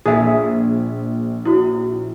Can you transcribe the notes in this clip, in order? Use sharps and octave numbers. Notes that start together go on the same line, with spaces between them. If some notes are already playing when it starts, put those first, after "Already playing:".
A#1 G#4 E5
E4 F#4